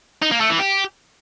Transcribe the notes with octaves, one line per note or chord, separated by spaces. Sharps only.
D#4
A#3
A3
E3
G4